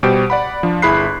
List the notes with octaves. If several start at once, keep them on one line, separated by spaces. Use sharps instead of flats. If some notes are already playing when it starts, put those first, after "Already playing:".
B2 G3 G4 C5 D7
D5 F#5 B5
F3 D4
G1 E4 G#4 B5 F#6 C7